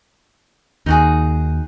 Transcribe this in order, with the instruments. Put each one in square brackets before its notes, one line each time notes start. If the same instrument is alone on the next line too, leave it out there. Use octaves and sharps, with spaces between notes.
[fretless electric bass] D#2 [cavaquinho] D#4 F#4 G#4